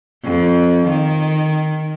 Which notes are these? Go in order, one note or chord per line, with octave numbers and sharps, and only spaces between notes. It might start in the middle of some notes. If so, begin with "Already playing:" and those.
F2
D#3